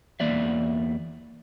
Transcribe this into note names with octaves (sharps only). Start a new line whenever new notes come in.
E2 A#3 D5 E5